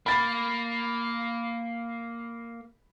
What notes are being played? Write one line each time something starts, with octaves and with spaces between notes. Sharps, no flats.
A#3 B5 A6